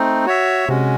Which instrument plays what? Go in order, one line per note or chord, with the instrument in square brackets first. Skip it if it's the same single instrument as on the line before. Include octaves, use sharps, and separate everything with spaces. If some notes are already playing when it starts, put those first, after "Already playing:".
Already playing: [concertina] A3 C4 D#4
F#4 C#5 E5
[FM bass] C3 [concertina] G#3 C#4 F#4